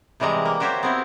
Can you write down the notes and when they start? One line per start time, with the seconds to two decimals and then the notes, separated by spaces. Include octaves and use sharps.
0.20 C3 E3 G3 G#3 A#5
0.45 A#3
0.60 F#4 G4 C5 C#5 E5
0.83 B3 C4 E4